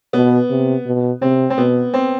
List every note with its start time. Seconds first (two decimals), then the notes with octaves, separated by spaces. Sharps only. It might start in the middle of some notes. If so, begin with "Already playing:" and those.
0.13 B2 B3
0.50 C3
0.86 B2
1.22 C3 C4
1.50 C4
1.58 B2 B3
1.94 C4